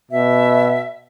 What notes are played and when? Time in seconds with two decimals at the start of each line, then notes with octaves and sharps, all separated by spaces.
0.11 B2 E5